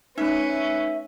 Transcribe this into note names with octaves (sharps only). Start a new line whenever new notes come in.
A3 C#4 D#4 B4 E5